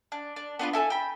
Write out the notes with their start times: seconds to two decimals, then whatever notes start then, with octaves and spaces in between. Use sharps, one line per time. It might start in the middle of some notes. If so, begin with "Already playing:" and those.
0.12 D4
0.36 D4
0.59 B3 D4 F4 B4
0.73 E4 A4 E5 G#5
0.90 G5 B5